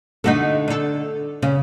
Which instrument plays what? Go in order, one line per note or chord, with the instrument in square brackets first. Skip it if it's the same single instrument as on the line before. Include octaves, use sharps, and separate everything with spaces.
[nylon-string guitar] D3 A3 [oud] D#4 F#4 A4
[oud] D4 A4
[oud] C#3 [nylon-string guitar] C#4